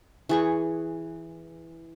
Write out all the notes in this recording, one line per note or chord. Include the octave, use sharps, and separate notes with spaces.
E3 G#4 C#6